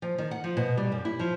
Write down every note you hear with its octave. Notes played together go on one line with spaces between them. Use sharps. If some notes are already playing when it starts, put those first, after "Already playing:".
F3
D#3
F#5
F3
B2
G3
F#2
E4
F3